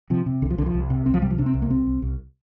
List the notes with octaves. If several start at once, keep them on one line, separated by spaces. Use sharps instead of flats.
C3 F3
C3
C2 D3
F3
C2 D3
F3
C2
C3
C2 C4
F3
C3 G3
F3
C3 D4
C4
C2
A#3
C2 C4
C2
C2